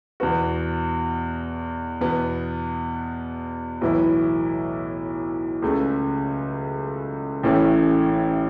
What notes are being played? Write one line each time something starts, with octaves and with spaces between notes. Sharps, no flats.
E2 B2 B3 F#4
E2 B2 B3
B1 A2 E3 B3 E4
C#2 C#3 A3
A1 A2 E3 A3 C#4